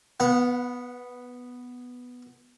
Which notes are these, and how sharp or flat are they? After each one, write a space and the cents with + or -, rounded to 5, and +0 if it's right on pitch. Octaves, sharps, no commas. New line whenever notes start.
B3 +0 F#5 -40